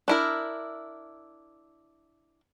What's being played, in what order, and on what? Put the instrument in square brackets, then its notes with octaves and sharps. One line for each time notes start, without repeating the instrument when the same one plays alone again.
[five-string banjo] D4 E4 A#4